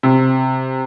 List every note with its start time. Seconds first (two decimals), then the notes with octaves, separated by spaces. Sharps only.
0.03 C3